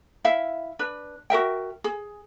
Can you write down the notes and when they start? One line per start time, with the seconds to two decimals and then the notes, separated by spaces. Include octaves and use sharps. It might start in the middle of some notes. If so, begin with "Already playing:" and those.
0.24 E4 E5 F5
0.79 D4 B4
1.30 F#4 A#4 E5 G5
1.84 G#4